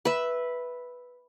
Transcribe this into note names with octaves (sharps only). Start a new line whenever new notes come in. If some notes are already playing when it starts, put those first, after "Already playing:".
B4 E5